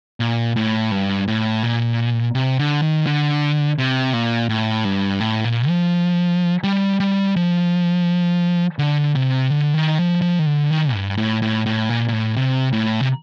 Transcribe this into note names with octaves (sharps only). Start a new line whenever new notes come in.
A#2
A2
G2
A2
A#2
C3
D3
D#3
D3
C3
A#2
A2
G2
A2
A#2
F3
G3
G3
F3
D3
C3
D3
D#3
F3
F3
D#3
D3
D#3
G2
A2
A2
A2
A#2
A#2
A2
C3
A2
C3